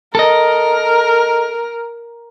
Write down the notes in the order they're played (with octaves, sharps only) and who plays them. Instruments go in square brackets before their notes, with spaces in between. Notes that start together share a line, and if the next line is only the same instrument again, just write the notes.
[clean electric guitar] A4 D#5 [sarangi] A#4